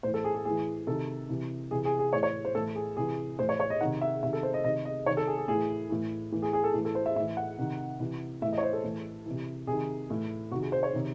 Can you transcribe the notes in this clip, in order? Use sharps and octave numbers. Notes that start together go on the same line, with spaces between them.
A2 E3 C5
A4
G#4
G#4
A2 E3 G#4
C3 D#3 A4
C3 E3
C3 E3 G#4
G#4
G#4
A2 E3 C#5
C#5
C5
A2 E3 A4
G#4
C3 E3 G#4
A2 E3 C5
C#5
C#5
D#5
C3 D#3 F#5
E5
C3 D#3 E5
A4
C5
D#5
C3 D#3 D#5
D#5
C3 D#3 C#5
A4
G#4
G#4
A2 E3 G#4
A2 E3
A2 E3
G#4
G#4
A4
A2 E3
A4
C5
E5
A2 E3 E5
F#5
C3 D#3
C3 E3
A2 E3 E5
D#5
C#5
C5
A4
A2 E3
C3 E3
C3 D#3 G#4
A2 E3
C3 D#3 F#4
G#4
C5
C#5
C3 D#3